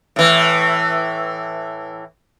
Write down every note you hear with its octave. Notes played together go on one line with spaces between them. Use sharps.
A2 E3